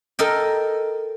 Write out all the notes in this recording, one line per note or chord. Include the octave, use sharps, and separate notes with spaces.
A4 A#4 D#5 G5